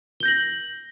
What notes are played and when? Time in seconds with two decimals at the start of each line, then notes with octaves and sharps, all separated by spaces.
0.20 G7
0.23 G6
0.25 A#6
0.28 F#7